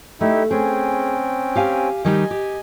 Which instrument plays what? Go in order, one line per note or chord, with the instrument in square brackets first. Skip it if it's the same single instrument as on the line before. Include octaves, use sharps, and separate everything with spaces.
[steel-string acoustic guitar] A3 [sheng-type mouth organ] D#4 E4 G4
[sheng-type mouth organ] C4 C#4 G5 [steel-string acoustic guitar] G#4
[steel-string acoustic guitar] G4 F5 G#5
[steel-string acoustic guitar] D#3 G3 D#4 [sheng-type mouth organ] D#5 G#5
[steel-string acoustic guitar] G4